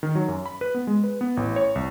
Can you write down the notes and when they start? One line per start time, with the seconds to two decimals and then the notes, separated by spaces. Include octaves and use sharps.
0.03 D#3
0.15 F#3
0.28 F#2
0.46 B5
0.61 B4
0.74 B3
0.87 G#3
1.04 B4
1.21 B3
1.37 A1
1.56 C#5
1.75 C2